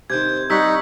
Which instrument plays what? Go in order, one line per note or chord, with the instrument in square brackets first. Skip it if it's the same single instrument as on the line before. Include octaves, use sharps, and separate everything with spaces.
[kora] C3 D#3 [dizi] C5 [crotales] G6 G#6
[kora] G3 F#5 [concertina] D#4 [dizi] C#6 [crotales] E6 B6